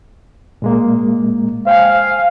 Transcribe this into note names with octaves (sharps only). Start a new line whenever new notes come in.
A#2 G#3 A#3
C5 F5 G5 G#5